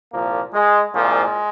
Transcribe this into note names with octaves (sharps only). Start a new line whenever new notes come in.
C2 A#2 F3 A#3
G#3
C2 A#2 F3 G#3